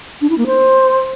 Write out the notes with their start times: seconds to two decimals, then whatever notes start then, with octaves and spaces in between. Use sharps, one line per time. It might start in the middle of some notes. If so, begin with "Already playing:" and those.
0.21 D4
0.30 E4
0.38 A#3
0.46 C5